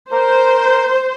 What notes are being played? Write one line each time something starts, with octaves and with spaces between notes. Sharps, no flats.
A#4 C5